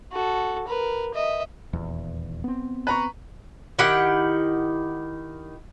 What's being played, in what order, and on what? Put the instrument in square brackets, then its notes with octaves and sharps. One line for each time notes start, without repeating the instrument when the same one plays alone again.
[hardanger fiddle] F#4 A4
A#4 B4
D#5 E5
[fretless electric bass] D#1 E2
B3 C4
[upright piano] B4 A#5 C#6
[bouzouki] D#3 E4 G4 F#5